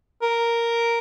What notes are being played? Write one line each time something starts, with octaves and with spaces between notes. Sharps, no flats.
A#4